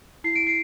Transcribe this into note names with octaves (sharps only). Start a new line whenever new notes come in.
E4 C7
D7
C7